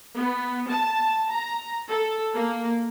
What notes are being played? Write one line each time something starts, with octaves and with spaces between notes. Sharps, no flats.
B3
A5
A#5
A4
A#3